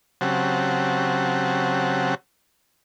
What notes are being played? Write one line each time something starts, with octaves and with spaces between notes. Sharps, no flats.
C#3 F#3 C4 G4 F#5 A5